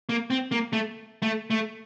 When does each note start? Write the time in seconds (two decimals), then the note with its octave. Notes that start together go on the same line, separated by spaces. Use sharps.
0.09 A#3
0.30 C4
0.52 A#3
0.73 A3
1.22 A3
1.50 A3